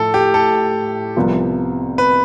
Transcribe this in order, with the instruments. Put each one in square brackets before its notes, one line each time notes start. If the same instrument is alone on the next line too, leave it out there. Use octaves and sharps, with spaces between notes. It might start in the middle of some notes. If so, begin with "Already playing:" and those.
Already playing: [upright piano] A2 F3 A3 [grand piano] A4
[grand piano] G4
A4
[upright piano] C2 C3 F3 B3 F4
[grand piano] B4